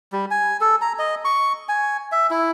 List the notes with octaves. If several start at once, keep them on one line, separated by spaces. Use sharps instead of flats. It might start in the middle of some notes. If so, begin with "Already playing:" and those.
G3
G#5
A4
A#5
D#5
C#6
G#5
E5
E4